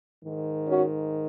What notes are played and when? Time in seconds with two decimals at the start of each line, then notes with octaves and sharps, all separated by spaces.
0.24 G#2 D#3
0.68 C#4 F#4